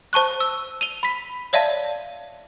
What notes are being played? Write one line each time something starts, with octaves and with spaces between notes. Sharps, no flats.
C5 A5 C#6 F#6
E6
D#7 F7 G7
B5 B6
C#5 D5 E5 F5 A5